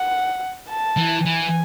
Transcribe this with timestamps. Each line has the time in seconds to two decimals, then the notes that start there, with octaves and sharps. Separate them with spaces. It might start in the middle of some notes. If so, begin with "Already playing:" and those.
Already playing: F#5
0.69 A5
0.97 E3
1.25 E3 G#5